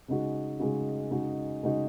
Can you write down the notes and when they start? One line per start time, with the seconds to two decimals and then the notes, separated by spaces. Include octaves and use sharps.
0.08 C#3 G#3 D#4 F#4
0.60 C#3 G#3 D#4 F#4
1.11 C#3 G#3 D#4 F#4
1.63 C#3 G#3 D#4 F#4